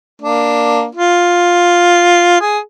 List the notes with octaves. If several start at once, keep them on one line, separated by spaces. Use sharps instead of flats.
A#3 D4
F4
G#4